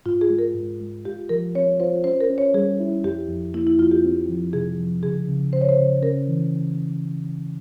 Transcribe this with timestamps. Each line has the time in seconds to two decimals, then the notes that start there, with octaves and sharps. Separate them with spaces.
0.06 G#2 F4
0.21 G#4
0.30 G#3
0.39 A#4
0.55 G#2
0.80 G#3
1.05 F4 G4
1.29 F3 A#4
1.55 C4 C#5
1.80 F4 C5
2.04 C#4 C5
2.21 A#4
2.30 C#4
2.38 C#5
2.54 G3 G#4
2.80 E4
3.04 F2 G4
3.29 F2
3.54 A#3 E4
3.67 E4
3.79 F2 F4
3.91 G4
4.04 C4
4.29 F3
4.53 C3 G#4
4.79 F3
5.03 C#3 G#4
5.28 C#3
5.53 C#3 C5
5.61 C#5
5.69 C5
5.78 C#3
6.02 C#4 A#4
6.28 E3